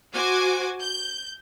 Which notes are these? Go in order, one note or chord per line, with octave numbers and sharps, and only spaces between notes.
F#4 C5 G#5 D6
G6